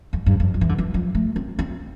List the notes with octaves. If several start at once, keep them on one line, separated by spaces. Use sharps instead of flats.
F2
G2
F2
F3
E3
D3
E3
F3
A3
C4
C4